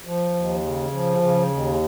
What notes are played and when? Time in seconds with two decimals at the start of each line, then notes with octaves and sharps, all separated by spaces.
0.05 F3
0.34 D#2
0.63 C#3
0.92 F3
1.20 C#3
1.50 D#2